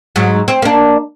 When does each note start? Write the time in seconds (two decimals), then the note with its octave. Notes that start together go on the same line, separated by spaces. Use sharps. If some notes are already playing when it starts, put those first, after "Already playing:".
0.16 G#2 F#3
0.48 C4
0.62 A#3 D4